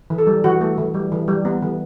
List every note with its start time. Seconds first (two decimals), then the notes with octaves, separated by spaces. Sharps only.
0.10 E3
0.18 A4
0.27 G3
0.44 E3 F#4
0.61 A3
0.78 E3
0.94 G3
1.12 E3
1.28 G3
1.45 B3
1.62 E3